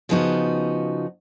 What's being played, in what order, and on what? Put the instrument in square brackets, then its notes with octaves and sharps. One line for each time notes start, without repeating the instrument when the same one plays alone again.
[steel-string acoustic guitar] C#3 F3 B3 D#4 F#4